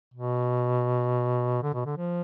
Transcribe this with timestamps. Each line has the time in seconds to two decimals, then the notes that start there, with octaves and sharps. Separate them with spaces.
0.14 B2
1.63 D3
1.74 B2
1.86 D3
1.97 F3